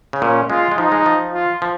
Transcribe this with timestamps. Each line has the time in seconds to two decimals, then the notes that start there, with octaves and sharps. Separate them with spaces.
0.13 C#3
0.22 A#2 C#4
0.50 G#3 F4
0.72 G#3
0.77 F3 D#4
0.92 G#3
1.06 F3
1.34 F4
1.62 F3